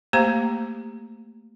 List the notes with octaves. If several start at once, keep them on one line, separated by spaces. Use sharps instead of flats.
A3 A#3 G4 C5 F5 A#5